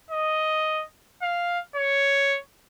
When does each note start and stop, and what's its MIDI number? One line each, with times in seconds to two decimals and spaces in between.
0.10 0.84 75
1.22 1.59 77
1.75 2.38 73